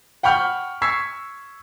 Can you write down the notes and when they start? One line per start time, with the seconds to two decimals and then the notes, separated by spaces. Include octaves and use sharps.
0.23 F#5 G5 B5 C#6 F6 G6
0.82 C#6 E6 G#6 B6 C7